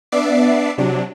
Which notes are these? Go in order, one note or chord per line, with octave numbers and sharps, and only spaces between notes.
B3 D4 D5 E5 D6 C7
C3 F#3 D4